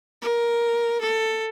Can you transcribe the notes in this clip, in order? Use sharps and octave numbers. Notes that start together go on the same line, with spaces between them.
A#4
A4